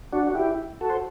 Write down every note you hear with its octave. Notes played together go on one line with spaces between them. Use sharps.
D4 F#4
F#4
E4 G4
F#4 A4
C5